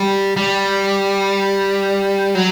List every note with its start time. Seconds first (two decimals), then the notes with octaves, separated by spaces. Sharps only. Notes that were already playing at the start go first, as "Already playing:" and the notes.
Already playing: G3
0.37 G3
2.35 F#3